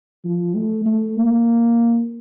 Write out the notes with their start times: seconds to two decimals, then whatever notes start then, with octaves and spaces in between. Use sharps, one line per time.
0.24 F3
0.55 A3
0.86 A3
1.17 A#3